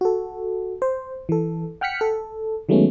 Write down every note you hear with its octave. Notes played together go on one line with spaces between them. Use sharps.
F#4 A4
C5
E3 A4
F#5 G5 F6 F#6 B6 C#7
A4
D#3 F#3 G#3 A3 B3 C#4